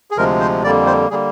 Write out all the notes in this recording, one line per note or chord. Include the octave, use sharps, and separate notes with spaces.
G#4
D2 C3 F3 G#3 A#4
C5
F2 D3 G3 A#3 D5
C5
D3 G3 A#3 G#4